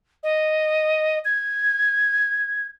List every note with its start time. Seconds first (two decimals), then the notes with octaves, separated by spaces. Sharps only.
0.23 D#5
1.25 G#6